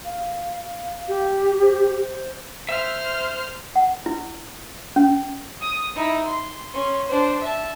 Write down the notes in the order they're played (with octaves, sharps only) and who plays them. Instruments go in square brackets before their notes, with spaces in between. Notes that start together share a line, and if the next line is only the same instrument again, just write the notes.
[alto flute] F5
[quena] G4
[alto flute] C5
[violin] C5 F6 [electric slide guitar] E5
[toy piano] F#5
E4
C#4
[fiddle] D#6
D#4 E4
C6
C#4 C6
D4 C5
E5 A5